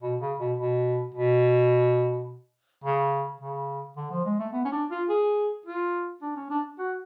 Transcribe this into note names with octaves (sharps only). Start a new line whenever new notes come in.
B2
C#3
B2
B2
B2
C#3
C#3
D3
F3
G#3
A3
B3
C#4
D4
F4
G#4
F4
D4
C#4
D4
F#4